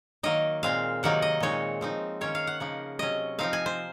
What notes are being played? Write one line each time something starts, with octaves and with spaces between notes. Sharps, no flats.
D#3 F#3 A#3 D#5
A#2 G#3 C4 F5
C3 D#3 F#3 A#3 D#4 F#5
D#5
A#2 G#3 C4 D#4 C#5
F3 C4 D#4
D#3 A#3 C#4 C#5
F5
F#5
C#3 F3 A#3 D#4
C3 F#3 C#4 D#5
F3 C4 D#4 F5
G#5
C5